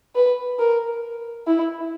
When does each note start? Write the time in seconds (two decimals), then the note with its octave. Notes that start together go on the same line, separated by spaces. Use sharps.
0.15 B4
0.59 A#4
1.47 E4